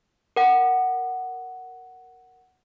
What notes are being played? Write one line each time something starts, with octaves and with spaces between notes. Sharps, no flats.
A#4 F#5